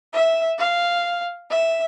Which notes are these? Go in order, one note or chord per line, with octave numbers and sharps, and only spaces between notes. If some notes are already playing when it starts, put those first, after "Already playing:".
E5
F5
E5